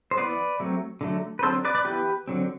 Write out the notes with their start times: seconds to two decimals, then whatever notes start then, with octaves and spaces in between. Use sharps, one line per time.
0.11 C5
0.17 E3 B3 B4 D5
0.60 F#3 A3 C4
1.01 D3 F#3 A3
1.39 B4
1.43 D3 F#3 C4 A4 C5
1.65 B4 D5
1.75 B4 D5
1.85 E3 B3 G4 B4
2.28 D3 F#3 C4